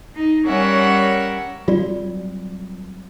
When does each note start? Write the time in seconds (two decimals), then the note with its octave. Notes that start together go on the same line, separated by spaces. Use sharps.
0.16 D#4
0.46 G3 C#4 A#4 C#5 E5 F#5
1.68 F#3 G3 C4 F4 F#4 D5